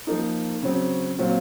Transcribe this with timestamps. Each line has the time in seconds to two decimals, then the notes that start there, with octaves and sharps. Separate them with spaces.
0.07 F3 A#3 D#4
0.62 C#3 F#3 C4
1.18 A#2 F#3 C4